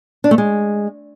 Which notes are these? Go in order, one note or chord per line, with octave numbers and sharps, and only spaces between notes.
D4
A3
G#3